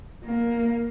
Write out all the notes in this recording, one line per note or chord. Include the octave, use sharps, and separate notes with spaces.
A#3